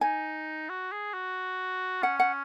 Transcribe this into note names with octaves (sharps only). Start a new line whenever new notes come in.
D#4 G#5
F#4
G#4
F#4
C#4 F#5
F#5